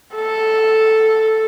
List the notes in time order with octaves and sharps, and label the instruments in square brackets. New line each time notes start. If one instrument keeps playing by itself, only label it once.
[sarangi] A4